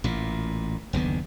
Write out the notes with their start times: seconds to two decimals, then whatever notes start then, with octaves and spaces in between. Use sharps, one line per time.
0.04 A1 A#2
0.93 F#1 D#2 D3 B3